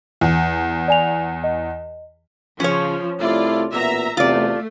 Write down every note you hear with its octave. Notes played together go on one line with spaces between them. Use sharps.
E2
D5 G#5 F7
D#5
C#3 F3 C#4 C#5
C2 A3 E4 F4 D5
A1 A#2 B3 E5 A#5
E2 C3 A3 F4 D5